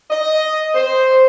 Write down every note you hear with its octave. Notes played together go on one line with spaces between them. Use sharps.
D#5
C5